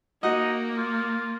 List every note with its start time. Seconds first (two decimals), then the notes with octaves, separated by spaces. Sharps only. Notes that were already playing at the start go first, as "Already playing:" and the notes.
0.23 A#3 D#4 F#4 D#5
0.77 F4